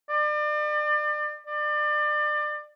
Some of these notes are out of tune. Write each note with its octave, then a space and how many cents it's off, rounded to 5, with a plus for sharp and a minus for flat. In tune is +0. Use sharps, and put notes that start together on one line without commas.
D5 +35
D5 +30